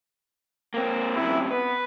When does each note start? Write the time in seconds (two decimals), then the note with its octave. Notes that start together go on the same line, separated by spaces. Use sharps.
0.74 A#3 C4
1.16 F#2 C3 E4
1.51 B3 B4